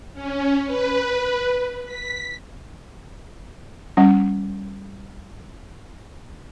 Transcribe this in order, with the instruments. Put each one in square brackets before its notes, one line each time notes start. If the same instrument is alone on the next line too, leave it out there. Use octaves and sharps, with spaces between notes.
[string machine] C#4
B4
B6
[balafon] G3 C#4 F#5